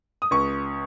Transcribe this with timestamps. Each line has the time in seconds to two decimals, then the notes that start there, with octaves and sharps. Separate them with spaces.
0.22 D#6
0.31 C#2 C#6